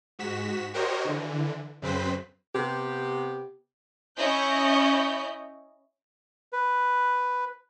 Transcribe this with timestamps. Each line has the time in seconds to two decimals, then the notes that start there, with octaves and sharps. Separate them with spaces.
0.19 G#2 F#4 B6 E7
0.74 F#4 G4 A#4 C5 C#5 D#5
1.05 D3 E3
1.82 F#2 C#3 C4 B4 C5 B6
2.55 C3 B3 G4
4.16 C#4 E4 C#5 D#5 G6
6.53 B4